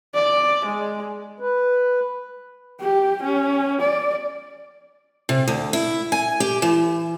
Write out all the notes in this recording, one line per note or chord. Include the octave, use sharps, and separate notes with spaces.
D5
G#3
B4
G4
C#4
D5
C3
D2
E4
G#5
G4
E3